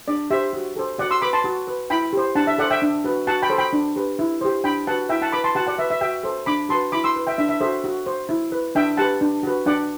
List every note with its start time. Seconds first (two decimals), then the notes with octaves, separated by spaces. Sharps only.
0.08 D4 D5
0.31 G4 C5 E5
0.53 F#4
0.76 A4 C5
0.98 F#4 D5 F#5
1.11 C6 E6
1.22 B4 B5 D6
1.33 A5 C6
1.44 F#4
1.68 B4
1.90 E4 G5 B5
2.13 G4 C5
2.35 D4 F#5 A5
2.47 E5
2.58 A4 C5 D5 F#5
2.70 E5 G5
2.82 D4
3.04 F#4 B4
3.27 F#4 F#5 A5
3.42 G5 B5
3.50 A4 C5
3.58 G5 B5
3.73 D4
3.96 G4 B4
4.19 E4
4.41 G4 C5
4.64 D4 G5 B5
4.87 F#4 B4 F#5 A5
5.09 E4 E5 G5
5.22 F#5 A5
5.32 B4 B5 D6
5.44 A5 C6
5.55 F#4 F#5 A5
5.67 D5 F#5
5.78 B4 E5
5.90 E5
6.01 F#4 E5 G5
6.23 A4 C5
6.46 D4 B5 D6
6.69 F#4 B4 A5 C6
6.92 E4 B5 D6
7.04 C6 E6
7.16 B4
7.27 E5 G5
7.38 D4 E5
7.49 E5
7.61 F#4 A4 C5 E5
7.84 F#4
8.06 C5
8.29 E4
8.52 B4
8.75 D4 E5 G5
8.97 G4 B4 F#5 A5
9.21 D4
9.43 F#4 B4
9.66 D4 D5 F#5